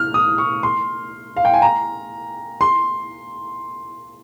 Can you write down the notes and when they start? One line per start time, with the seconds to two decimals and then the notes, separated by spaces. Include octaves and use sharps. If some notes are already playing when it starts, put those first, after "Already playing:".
Already playing: F6
0.14 D#6
0.38 C#6
0.63 C6
1.36 F5
1.45 G5
1.54 G#5
1.62 A#5
2.61 C6